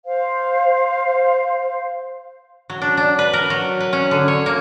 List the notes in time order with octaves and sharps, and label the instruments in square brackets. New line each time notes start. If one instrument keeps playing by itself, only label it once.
[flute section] C5 F5
[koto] F#3
D4
D4
B4
A#4
F#3
B4
C#4
D3
C#5
A#3